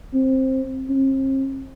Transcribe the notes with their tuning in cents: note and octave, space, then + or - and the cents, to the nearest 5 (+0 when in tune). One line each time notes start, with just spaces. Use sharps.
C4 +10
C4 +40